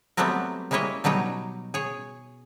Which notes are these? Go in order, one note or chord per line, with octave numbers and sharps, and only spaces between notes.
F#3 G3 A3 B3 C4 A#4
G3 G#3 A#3 E4 C#5 D#5
B2 F#3 G3 D#4 C#5
G#4 C#5